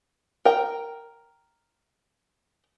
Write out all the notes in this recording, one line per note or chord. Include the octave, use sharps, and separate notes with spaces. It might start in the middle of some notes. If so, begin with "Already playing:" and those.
A#4 G5